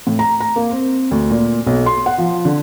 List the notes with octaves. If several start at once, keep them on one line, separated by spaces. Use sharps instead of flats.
A2
A#5
A#5
A#3
C4
D2
A#2
B1
C6
F#5
F3
D3